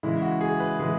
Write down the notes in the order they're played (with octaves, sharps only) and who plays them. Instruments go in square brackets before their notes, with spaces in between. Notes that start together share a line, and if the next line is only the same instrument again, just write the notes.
[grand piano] C#3 E3 G#3 E4
F#4
G#4
B4
C#3 E3 G#3 G#4